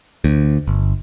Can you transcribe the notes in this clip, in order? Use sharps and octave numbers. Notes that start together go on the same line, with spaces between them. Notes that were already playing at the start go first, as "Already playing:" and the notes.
D2
G1